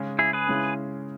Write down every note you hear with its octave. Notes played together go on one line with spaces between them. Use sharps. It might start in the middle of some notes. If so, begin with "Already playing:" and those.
Already playing: C#3 G#3 C#4
E4 G#4
G#4 B4
C#3 G#3 C#4 E4